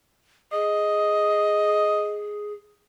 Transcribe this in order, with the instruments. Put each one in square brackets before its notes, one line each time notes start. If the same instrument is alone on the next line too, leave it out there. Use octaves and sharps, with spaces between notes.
[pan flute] G#4 [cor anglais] D#5